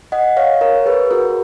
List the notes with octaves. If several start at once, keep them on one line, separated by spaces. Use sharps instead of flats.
D#5 F#5
C#5 F5
A#4 C#5
G#4 B4
F#4 A#4